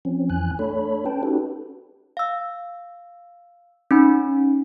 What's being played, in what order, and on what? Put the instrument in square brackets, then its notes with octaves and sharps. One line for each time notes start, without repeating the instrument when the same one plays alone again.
[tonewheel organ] F3 C4 C#4
F2 E3 G#5 F#6
A3 D4 A4 C#5 B5
C#4 B4 G5 A5
C#4 D#4 F#4 G4 A4 B4
[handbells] F5 E6
C#4 D#4 B5